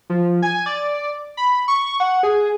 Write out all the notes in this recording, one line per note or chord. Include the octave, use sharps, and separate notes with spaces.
F3
G#5
D5
B5
C#6
F#5
G#4